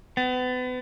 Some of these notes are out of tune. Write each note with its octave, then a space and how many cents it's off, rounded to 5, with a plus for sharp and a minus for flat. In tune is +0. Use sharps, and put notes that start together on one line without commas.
B3 +35